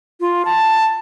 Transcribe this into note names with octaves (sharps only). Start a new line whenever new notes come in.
F4
A5